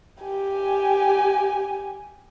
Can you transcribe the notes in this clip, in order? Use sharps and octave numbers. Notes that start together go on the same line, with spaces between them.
G4 G#5